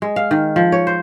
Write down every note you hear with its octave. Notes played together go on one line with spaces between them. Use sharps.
G#3
F5
D#3
F3
C#5
C5